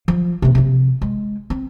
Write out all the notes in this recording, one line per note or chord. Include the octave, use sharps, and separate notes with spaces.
F3
C3 A#3
C3 F3
G#3
C4